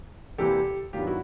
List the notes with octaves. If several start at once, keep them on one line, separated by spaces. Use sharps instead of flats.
E2 C3 E3 G3 A#3 G4 A4
G2 D#3 F#3 B3 F4 G4
E4 F#4